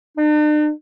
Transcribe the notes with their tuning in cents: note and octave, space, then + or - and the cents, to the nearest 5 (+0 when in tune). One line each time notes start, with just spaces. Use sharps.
D4 +45